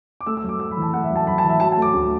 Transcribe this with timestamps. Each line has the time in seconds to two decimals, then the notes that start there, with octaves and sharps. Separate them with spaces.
0.21 D6
0.26 A3 E6
0.37 E6
0.43 F#2
0.49 D6
0.60 F#2 E6
0.71 B5
0.77 E3
0.82 A5
0.93 A3 F#5
1.04 E5
1.10 F#2
1.16 A5
1.27 F#2 B5
1.38 A5
1.44 E3
1.49 E5
1.60 F#3 A5
1.72 A5
1.77 A3 D6
1.94 D2